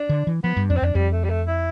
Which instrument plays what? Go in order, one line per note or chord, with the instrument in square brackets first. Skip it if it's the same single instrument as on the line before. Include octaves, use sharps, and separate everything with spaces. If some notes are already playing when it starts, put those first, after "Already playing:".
Already playing: [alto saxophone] D4
[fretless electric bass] D3
E3
[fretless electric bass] F3 [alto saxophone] B3
[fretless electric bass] G2
[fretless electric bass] F2 [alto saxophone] D4
[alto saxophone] C4
[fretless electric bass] F2 [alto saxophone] D4
[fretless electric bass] F2 [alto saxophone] G3
[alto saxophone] A3
G3
A3
E4